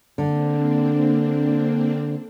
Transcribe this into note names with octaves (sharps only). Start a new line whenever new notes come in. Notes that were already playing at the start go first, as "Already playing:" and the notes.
D3 A#3 C4 D4